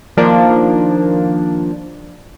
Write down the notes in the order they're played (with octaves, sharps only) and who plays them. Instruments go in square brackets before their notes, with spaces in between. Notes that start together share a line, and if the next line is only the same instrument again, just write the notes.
[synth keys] D#3 F3 A#3 D4